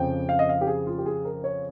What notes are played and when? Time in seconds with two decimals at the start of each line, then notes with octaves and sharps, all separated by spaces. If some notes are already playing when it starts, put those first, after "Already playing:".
Already playing: F2 C#3 F3 G5
0.29 F5
0.39 D#5
0.49 F5
0.61 G4
0.67 G#4
0.87 F4
0.98 G4
1.06 G#4
1.25 A#4
1.44 C#5